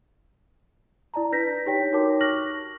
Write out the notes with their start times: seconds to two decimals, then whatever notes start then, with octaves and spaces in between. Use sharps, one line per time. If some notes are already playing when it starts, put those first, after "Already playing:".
1.14 E4 D5 A5 A#5
1.32 D4 B4 G6 A#6 B6
1.66 D#4 G4 C#5 G5 B6
1.92 D#4 F#4 A#4 C#5 A5 D6
2.21 C#6 F6 F#6 A#6 F#7